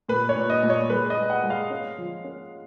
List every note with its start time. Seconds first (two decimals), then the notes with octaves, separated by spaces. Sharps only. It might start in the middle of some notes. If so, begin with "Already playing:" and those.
0.08 A#2 B4
0.29 C#5
0.36 A#2
0.50 D#5
0.63 A#2
0.70 C#5
0.90 G#3 B4
1.10 D#5
1.17 G#3
1.30 F#5
1.43 G#3
1.50 F5
1.70 C#4
1.98 F3
2.24 C#4